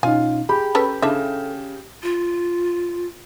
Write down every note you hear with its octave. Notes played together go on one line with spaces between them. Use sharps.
B2 C#4 D#4 F4 G#5
G4 G#4 B5
C#4 A4 B4
C#3 D4 E4 A4 E5
F4